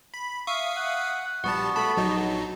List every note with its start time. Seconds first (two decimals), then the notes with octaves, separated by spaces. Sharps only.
0.14 B5
0.47 E5 F5 C#6 D#6
0.76 F#5
1.44 A#1 G3 B3 F#4 F#5 A5
1.76 A3 A5 B5
1.97 A#1 F#3 D#4